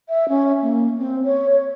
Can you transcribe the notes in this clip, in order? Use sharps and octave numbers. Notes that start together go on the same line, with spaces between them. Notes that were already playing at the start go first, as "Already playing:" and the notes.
E5
C#4
A#3
C4
C#5
C#5